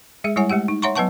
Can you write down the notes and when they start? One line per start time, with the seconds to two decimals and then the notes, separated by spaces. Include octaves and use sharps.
0.24 G#3 G#4 E5
0.36 G3 G#3 E4 C#5 F#5 G#5
0.50 G#3 A3 G4 F#5
0.68 D#4
0.82 C#5 E5 F#5 A#5 C6 C#6
0.96 F#3 B3 B4 F#5 A5 C#6